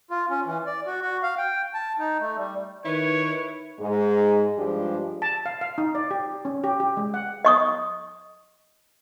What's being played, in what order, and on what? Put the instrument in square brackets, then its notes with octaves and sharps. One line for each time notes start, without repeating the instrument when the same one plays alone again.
[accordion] F4
C#4
E3
D5
F#4
F#4
F5
G5
A5
D#4
A3
G3
[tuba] D#3 [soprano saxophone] E4 [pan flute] B4 [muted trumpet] C#5
[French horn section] G#2 G#3
G2 F3 G#3 D4 G4
[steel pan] A5
F5
F5
D#4
D5
G4
C#4
G4
G4
G#3
F#5
[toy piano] D#5 C#6 D#6